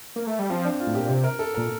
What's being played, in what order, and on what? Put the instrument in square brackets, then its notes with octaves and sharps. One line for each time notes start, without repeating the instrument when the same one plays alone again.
[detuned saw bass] A#3
A3
G3
[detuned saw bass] F3 [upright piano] C4
[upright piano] D4
F4
[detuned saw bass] A2
[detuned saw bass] A#2 [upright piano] G4
[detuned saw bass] C3
[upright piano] A#4
A4
[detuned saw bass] A#2 [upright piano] A#4